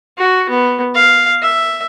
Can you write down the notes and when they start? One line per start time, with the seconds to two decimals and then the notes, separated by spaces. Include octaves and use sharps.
0.18 F#4
0.49 B3
0.95 F5
1.42 E5